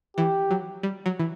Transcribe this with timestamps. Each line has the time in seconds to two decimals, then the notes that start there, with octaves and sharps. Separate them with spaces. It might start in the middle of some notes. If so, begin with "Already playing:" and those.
0.17 E3 G4
0.51 F#3
0.83 G3
1.06 F#3
1.19 E3